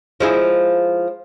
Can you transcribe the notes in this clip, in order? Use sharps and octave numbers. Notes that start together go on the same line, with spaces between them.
F3 G#3 E4